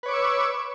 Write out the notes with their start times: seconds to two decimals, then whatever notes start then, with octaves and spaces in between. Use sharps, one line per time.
0.03 B4
0.06 C#5
0.08 D6
0.11 C#6
0.14 E6